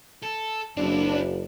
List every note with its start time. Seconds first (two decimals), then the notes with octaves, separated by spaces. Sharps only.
0.23 A4
0.77 F#1 C4 D4 E4